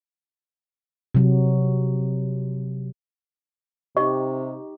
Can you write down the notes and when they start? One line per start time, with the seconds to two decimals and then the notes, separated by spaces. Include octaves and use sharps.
1.15 C3 F#3
3.97 C3 D#4 G4 D#5 C#6